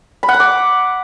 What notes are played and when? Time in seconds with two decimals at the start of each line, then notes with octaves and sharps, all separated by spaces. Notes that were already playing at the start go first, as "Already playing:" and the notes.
0.23 B5
0.29 F#5
0.34 B5
0.40 D6